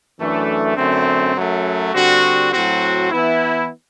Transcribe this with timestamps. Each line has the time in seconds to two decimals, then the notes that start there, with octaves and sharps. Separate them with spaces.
0.18 F#2 E3 A3 D4
0.77 F#2 D3 A3 C4
1.35 F#2 F#3 A3
1.93 D3 G3 C4 F#4
2.52 A2 F#3 C4 F#4
3.11 E3 B3 E4